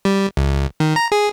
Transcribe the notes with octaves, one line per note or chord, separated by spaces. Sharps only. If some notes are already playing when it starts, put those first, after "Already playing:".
G3
C#2
D#3
A#5
G#4